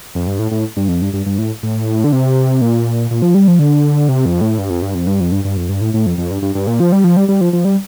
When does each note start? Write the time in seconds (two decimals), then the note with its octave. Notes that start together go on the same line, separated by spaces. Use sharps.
0.15 F2
0.27 G2
0.39 A2
0.51 A2
0.77 G2
0.88 F2
1.02 G2
1.13 G2
1.26 G2
1.38 A2
1.63 A2
2.04 D3
2.12 C3
2.61 A#2
3.11 A#2
3.22 F3
3.34 G3
3.48 F3
3.59 D3
4.09 C3
4.26 F2
4.41 A2
4.58 G2
4.70 F2
4.82 G2
4.95 F2
5.07 G2
5.20 F2
5.32 G2
5.45 G2
5.57 F2
5.69 G2
5.81 A2
5.94 A2
6.06 F2
6.18 F2
6.31 G2
6.42 G2
6.55 G2
6.67 A#2
6.80 F3
6.92 G3
7.04 F3
7.17 G3
7.29 G3
7.41 F3
7.53 F3
7.65 G3